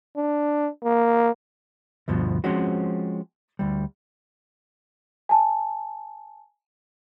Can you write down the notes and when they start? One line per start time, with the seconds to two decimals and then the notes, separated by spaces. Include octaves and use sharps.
0.16 D4
0.84 A#3
2.08 D2 G2 B2 F3
2.44 F3 G#3 C4 C#4 F#4
3.59 D2 G3
5.29 G#5 A5